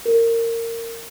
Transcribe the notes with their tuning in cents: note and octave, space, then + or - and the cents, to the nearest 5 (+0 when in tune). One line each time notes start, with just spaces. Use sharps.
A#4 -20